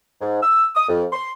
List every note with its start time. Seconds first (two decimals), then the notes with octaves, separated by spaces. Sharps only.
0.21 G#2
0.42 E6
0.75 D#6
0.89 F2
1.13 C6